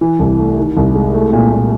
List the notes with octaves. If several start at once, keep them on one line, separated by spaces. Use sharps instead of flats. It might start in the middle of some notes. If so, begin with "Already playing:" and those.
E3
C2
A3
D#3
C2
G#3
A3
A#2
A#2